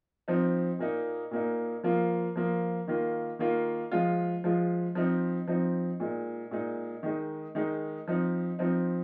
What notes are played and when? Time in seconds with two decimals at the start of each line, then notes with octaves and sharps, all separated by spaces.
0.28 F3 C4 D#4
0.79 A#2 A#3 D#4
1.31 A#2 A#3 D#4
1.84 F3 A#3 F4
2.36 F3 A#3 F4
2.88 D#3 A#3 F4
3.39 D#3 A#3 F4
3.92 F3 G#3 F4
4.44 F3 G#3 F4
4.95 F3 C4 D#4
5.48 F3 C4 D#4
6.00 A#2 G#3 D#4
6.51 A#2 G#3 D#4
7.03 D#3 G#3 D#4
7.55 D#3 G#3 D#4
8.08 F3 C4 D#4
8.59 F3 C4 D#4